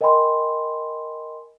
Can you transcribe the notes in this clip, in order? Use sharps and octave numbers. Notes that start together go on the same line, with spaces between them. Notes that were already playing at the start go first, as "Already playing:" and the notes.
A#4 D#5 G5 G#5 B5 C6